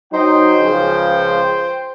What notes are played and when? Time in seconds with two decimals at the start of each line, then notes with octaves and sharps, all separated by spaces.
0.12 F#3 D#4 C5 G5
0.60 C#2 C#3 F3